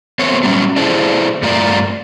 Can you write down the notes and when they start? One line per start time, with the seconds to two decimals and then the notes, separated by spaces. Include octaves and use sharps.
0.19 A3 B3 C4 C#5
0.43 F#3 G3 C4 C#4
0.76 E4 G#4 A4 C5 D5
1.42 G2 A3 F4 A#4 D5